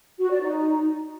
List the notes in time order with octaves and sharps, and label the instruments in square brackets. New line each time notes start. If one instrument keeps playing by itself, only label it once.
[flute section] F#4
D5
D#4